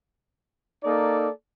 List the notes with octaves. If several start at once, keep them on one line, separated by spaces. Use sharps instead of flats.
A#3 D#4 A4 D5